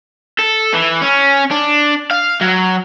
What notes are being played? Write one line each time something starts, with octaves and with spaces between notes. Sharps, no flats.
A4
E3
C#4
D4
F5
F#3